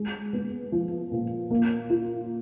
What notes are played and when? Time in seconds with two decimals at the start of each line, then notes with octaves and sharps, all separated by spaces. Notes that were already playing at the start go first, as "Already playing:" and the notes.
Already playing: G#3
0.33 B3
0.72 F3
1.12 A#2
1.51 A#3
1.90 F4